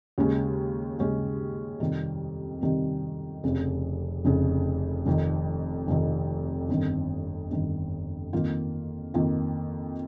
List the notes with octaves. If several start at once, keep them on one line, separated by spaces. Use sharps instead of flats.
D#2 C#3 G#3 C#4
D#2 C#3 G#3 C#4
F2 C3 D#3 G3
F2 C3 D#3 G3
F1 F2 C#3
F1 F2 C#3
F1 F2 D#3
F1 F2 D#3
G1 F2 D#3
G1 F2 D#3
F2 D#3 A#3 F4
F2 D#3 A#3 F4